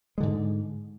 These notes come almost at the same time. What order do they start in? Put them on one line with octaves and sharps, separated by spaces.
G#3 D3 G#2